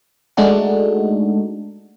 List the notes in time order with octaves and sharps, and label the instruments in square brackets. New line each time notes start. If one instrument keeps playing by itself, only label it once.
[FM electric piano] G#3 A3 D4 D#4 F#4 A4